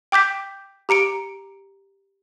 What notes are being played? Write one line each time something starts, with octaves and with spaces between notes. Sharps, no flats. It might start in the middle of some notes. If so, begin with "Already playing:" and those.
G5 D6 G6 B6
G4 A#5 C#7 D7